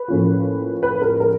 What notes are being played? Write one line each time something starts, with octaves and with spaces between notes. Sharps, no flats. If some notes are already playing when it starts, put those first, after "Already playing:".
Already playing: B4
A2 F3 A#3 C#4 F4
B4
A#4
A#4